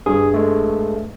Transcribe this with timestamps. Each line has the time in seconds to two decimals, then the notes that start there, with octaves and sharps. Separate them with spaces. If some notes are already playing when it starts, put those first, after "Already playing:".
0.06 G2 G#4
0.34 G#3 A3